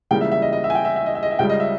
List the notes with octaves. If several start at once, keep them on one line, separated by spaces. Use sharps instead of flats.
C#2 C#3 E3 G3 A#3 G5
E5
E5
D#5
D#5
E5
G#5
G5
E5
E5
D#5
E5
D#5
E5
C#2 C#3 G3 G5
D#5
E5